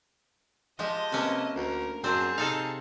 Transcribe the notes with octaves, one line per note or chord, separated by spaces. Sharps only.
F3 G#3 G4 D#5 A5
C3 A#3 C#4 B4
D2 A#4
F#2 C4 D4 G#4 C5 A5
C3 D#4 A4 F5